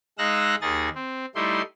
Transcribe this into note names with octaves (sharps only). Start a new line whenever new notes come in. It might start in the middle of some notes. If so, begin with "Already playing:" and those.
G#3 D#4 F5 E6 F#6 A#6
D#2 D#4 G#4 D#5 A6
C4
G3 A3 D#4 E4 C6